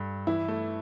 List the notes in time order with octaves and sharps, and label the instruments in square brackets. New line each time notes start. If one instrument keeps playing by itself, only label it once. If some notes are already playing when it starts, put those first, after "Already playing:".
Already playing: [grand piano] G2 A4
[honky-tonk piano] E3 [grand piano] E4
[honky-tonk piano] A3